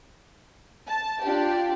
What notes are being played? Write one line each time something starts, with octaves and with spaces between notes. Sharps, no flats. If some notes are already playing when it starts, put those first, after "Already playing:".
A5
D4 F4 G4